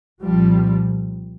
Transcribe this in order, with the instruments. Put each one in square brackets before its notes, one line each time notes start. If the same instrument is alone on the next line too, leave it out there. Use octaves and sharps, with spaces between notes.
[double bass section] C2 A#2 F3 G3